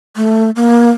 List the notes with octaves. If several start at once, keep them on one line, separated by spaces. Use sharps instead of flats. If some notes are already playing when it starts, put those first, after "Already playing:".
A3
A#3